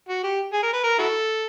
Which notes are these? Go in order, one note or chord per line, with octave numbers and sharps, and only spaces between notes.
F#4
G4
G#4
A#4
B4
A#4
E4 F#4 A4